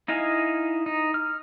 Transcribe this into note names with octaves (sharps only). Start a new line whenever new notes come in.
D#4 E4 D#5 F5 G#5
D#4
F6